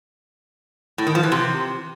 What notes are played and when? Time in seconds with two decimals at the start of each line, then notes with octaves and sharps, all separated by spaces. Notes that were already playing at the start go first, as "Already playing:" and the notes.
0.98 A2
1.07 D#3
1.15 F3
1.23 E3
1.32 C3